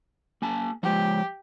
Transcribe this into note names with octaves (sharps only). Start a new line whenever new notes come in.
A#3 G#5 A5
F3 G#3 G4